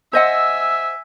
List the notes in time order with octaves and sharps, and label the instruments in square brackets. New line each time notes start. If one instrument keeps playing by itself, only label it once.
[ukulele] C5 D#5 F#5 [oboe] E5 [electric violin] G#5 E6